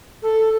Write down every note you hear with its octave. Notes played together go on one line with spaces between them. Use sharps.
A4